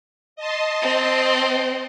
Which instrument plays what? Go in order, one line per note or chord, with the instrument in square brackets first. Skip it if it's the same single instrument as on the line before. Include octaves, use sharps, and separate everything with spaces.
[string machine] D#5 A5 C6
[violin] C4